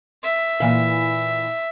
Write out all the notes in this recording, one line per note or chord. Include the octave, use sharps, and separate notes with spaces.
E5
A#2 E3 F5